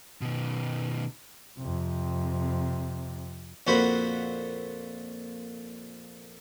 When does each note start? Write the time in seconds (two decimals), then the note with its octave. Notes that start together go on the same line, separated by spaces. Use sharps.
0.21 B2 D#3
1.59 F2 C3
3.67 F2 A#2 F#4 C5 F#5 B5